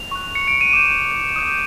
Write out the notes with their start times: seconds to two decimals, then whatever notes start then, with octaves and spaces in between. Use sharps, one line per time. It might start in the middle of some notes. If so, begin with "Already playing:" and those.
Already playing: F7
0.11 C#6 F#6
0.35 C#7
0.48 D7
0.61 D#7
0.73 D6 G6 E7
1.36 D#6 G6